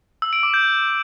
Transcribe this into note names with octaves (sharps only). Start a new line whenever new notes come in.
E6
D7
D6
G6